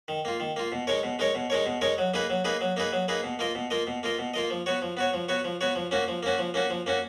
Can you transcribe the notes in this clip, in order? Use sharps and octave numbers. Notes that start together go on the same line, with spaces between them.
D#3
A#3 F4
D#3
A#3 F4
B2
G#3 D#4 A#4 C#5
B2
G#3 D#4 A#4 C#5
B2
G#3 D#4 A#4 C#5
B2
G#3 D#4 A#4 C#5
F#3
A#3 D#4 G#4 B4
F#3
A#3 D#4 G#4 B4
F#3
A#3 D#4 G#4 B4
F#3
A#3 D#4 G#4 B4
B2
A#3 F4 A#4 D#5
B2
A#3 F4 A#4 D#5
B2
A#3 F4 A#4 D#5
B2
A#3 F4 A#4 D#5
F3
B3 F#4 C#5
F3
B3 F#4 C#5
F3
B3 F#4 C#5
F3
B3 F#4 C#5
F3
A#3 C#4 F#4
F3
A#3 C#4 F#4
F3
A#3 C#4 F#4
F3
A#3 C#4 F#4